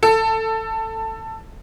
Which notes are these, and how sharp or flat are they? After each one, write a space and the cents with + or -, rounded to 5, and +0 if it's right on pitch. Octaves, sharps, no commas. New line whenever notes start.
A4 +15